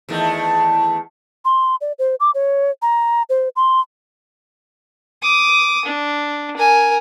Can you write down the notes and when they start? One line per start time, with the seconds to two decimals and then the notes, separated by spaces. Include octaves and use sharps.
0.09 E2 D#3 A3
1.45 C6
1.81 D5
1.99 C5
2.20 D6
2.35 C#5
2.82 A#5
3.30 C5
3.56 C6
5.22 D6 D#6
5.85 D4
6.56 A#4 G#5